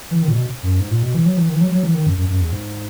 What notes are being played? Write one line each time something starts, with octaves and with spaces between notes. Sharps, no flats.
E3
D#3
A#2
B2
F#2
G#2
A#2
B2
E3
F#3
E3
D#3
E3
F#3
F#3
E3
D#3
F#2
F#2
F#2
E2
G#2